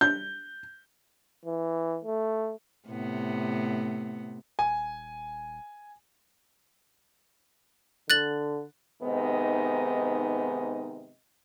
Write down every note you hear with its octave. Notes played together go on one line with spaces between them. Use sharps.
G6
E3
A3
A2 C3 B3
D#1 G#5
D3 F#6 A6 F#7
G#2 C3 D#3 B3 D#5